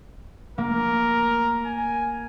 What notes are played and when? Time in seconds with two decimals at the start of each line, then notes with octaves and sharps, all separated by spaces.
0.58 A#3 A#4
1.66 G#5